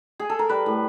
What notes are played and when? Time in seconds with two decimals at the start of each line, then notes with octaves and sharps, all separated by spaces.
0.19 G#4
0.29 A4
0.39 A#4
0.49 G3 B4
0.66 A2